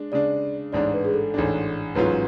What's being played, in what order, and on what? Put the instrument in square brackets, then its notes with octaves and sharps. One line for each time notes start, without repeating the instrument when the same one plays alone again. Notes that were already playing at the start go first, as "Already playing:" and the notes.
Already playing: [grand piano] G#3 D4
[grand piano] C#3 G#3 D4 [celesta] D5
[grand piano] A1 G#2 G#3 D4 [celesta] D5
[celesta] B4
G#4
A4
[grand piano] A1 G#2 G#3 D4
[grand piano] A1 G#2 F#3 C#4 F4 [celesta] B4